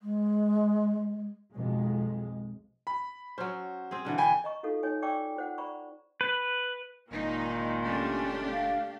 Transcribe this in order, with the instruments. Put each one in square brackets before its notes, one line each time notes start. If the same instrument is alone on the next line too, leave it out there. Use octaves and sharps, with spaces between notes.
[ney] G#3
[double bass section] B1 F2 G#3
[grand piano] B5
[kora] F#3 C#4 [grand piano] C5
[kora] C4 G#4
B2 D3 E3
[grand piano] G5 G#5 B5
[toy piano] D#5 A#5 C#6
D#4 F4 F#4 A4 F5
D#4 C#5 G#5
D5 G5 A5 C#6 D6 E6
F4 C5 F#5
C5 D5 A#5 B5 C#6
[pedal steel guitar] B4
[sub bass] F#1 [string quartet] A#2 D#3 G#3 [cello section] D#4
[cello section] A3 D4 G4 [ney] C#4
[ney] F5